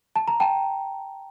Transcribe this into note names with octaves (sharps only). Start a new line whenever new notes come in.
A5
A#5
G5 A5